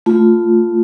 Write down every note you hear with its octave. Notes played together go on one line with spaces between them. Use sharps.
A3 F4